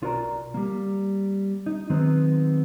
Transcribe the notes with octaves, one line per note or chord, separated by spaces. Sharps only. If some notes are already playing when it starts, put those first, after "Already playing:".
B1 F4 F#4 A#4 D5 A#5
G3 A#3
D#4
D#3 F#3 G#3 B3 C4 D#4